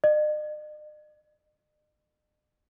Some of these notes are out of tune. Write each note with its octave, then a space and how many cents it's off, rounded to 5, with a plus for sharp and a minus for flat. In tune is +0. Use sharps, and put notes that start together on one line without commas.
D#5 -45